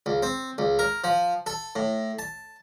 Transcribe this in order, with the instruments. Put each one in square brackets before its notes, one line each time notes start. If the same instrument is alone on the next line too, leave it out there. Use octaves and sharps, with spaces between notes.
[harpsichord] C#2
C4
C#2
A#4
F3
A4
A2
A5